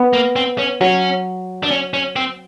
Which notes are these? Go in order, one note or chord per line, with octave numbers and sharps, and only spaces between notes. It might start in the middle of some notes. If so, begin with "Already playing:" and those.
Already playing: B3
A#3
C4
C#4
F#3 C#4
D4
C#4
C#4
C4